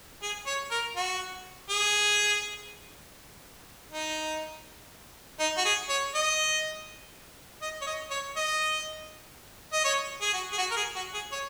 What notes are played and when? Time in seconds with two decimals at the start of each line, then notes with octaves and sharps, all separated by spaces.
0.23 G#4
0.46 C#5
0.71 A#4
0.96 F#4
1.70 G#4
3.91 D#4
5.40 D#4
5.57 F#4
5.65 G#4
5.89 C#5
6.15 D#5
7.62 D#5
7.82 C#5
7.87 D#5
8.11 C#5
8.36 D#5
9.73 D#5
9.85 C#5
10.21 G#4
10.34 F#4
10.52 G#4
10.58 F#4
10.71 A#4
10.77 G#4
10.96 F#4
11.14 G#4
11.32 C#5